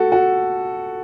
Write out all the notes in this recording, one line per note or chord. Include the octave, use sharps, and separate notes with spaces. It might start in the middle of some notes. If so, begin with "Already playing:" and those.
Already playing: F#4 A4
F#4